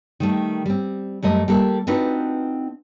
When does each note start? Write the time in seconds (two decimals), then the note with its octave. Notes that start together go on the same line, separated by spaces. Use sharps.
0.20 D#3 G3 A3
0.66 G3 C4
1.23 F#2 G3 A3 D#5
1.48 G3 A#3 A4
1.87 C4 D4 D#4 F4 F#4 B4